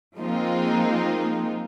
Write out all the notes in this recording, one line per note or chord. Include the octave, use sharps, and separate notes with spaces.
F3 G#3 A#3 C4 D#4 F4